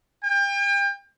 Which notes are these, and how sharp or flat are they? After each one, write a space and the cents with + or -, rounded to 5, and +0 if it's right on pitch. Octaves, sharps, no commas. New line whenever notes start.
G5 +35